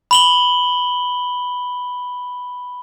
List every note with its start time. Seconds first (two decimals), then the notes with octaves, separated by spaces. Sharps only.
0.11 B5 F#7 G7